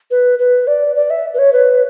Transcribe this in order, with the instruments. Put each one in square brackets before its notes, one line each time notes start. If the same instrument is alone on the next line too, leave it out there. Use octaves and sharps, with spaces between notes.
[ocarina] B4
B4
D5
D5
E5
B4
C#5
B4